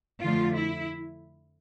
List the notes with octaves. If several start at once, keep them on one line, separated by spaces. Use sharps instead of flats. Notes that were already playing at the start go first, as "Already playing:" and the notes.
F2 D3 F3 A3 F4
E4